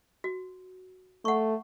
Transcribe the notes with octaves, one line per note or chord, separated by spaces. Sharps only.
F#4
A3 F#5 C#6